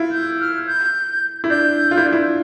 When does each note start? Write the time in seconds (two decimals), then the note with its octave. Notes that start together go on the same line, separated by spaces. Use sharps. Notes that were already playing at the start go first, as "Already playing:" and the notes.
Already playing: E4 F4
0.11 G6
0.40 F6
0.67 G6
1.44 E4
1.49 D4 G6
1.91 F4
1.97 E4
2.05 D4
2.13 E4